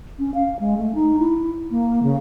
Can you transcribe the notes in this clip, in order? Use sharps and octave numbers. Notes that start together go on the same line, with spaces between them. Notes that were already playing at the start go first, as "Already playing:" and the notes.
C#4
F5
G#3
A3
D#4
E4
A#3
C#3